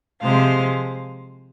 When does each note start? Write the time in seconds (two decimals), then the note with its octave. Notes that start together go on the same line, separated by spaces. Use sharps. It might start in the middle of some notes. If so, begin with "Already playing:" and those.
0.21 C3 F3 G#3 C5 F5